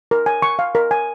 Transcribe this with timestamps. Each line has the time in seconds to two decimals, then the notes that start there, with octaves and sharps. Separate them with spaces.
0.11 A#4
0.26 G#5
0.42 C#6
0.59 F5
0.75 A#4
0.91 G#5